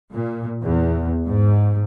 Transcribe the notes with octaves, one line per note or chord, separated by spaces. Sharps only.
A#2
E2
G#2